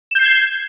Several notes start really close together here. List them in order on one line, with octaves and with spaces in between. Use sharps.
E7 G6 C7 G#6